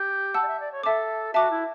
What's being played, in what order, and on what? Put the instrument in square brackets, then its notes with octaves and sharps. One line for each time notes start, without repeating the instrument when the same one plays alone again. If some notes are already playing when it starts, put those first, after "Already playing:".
Already playing: [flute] G4
[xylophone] F#5 A5 E6
[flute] D5
E5
D5
C#5
[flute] A4 [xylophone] E5 A5 D6
[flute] F#4 [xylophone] E5 A5 D6
[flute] E4